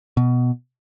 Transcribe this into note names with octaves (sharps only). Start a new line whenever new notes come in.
B2